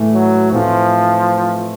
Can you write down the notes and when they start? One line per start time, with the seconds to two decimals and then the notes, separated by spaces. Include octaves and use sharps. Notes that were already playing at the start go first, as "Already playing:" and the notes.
Already playing: A2 E3 A3
0.14 F#3
0.52 A2 E3 F3 A3 C4